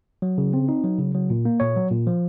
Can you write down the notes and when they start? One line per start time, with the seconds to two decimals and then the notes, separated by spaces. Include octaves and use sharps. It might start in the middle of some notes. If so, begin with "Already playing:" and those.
0.22 F#3
0.38 C#3
0.54 C4
0.69 D#4
0.84 F#3
0.99 C#3
1.15 F#3
1.30 A#2
1.45 A#3
1.60 A#2 C#5
1.76 F#3
1.91 A#2
2.07 F3